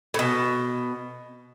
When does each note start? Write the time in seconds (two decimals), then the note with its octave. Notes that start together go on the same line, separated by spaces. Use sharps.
0.14 A2
0.19 B2